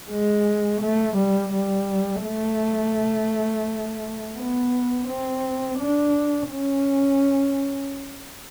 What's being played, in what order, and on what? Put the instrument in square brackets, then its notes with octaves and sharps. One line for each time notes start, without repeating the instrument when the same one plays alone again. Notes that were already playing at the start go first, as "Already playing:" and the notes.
[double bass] G#3
A3
G3
G3
A3
B3
C4
D4
C#4